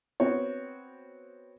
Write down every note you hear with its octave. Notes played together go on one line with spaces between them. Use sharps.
B3 C4 F#4 C#5